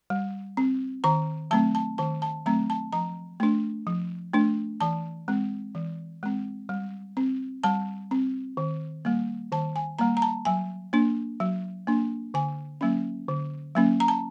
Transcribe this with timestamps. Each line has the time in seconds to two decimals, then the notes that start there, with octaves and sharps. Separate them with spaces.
0.10 G3
0.57 C4
1.04 D#3 A#5
1.51 F#3 A3 C4 A5
1.75 A5
1.98 D#3 A5
2.22 A5
2.46 F#3 A3 C4 A#5
2.70 A5
2.93 F3 A#5
3.40 A3 D4
3.87 F3
4.33 A3 D4
4.80 E3 A5
5.28 G#3 C4
5.75 E3
6.23 G#3 C4
6.69 G3
7.17 C4
7.64 G3 A5
8.11 C4
8.57 D#3
9.05 G3 A#3
9.52 D#3 A5
9.76 G#5
9.99 G3 A#3 A#5
10.17 A#5
10.22 A5
10.45 F#3 G#5
10.93 A#3 D4
11.40 F#3
11.87 A#3 D4
12.34 D3 G#5
12.81 F#3 A#3 C#4
13.28 D3
13.75 F#3 A#3 C#4
14.00 A#5
14.08 A5